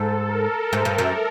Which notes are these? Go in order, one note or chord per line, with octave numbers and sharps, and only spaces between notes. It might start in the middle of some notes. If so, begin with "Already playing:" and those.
Already playing: G#2 A4
A#4
G#2
G2
F#2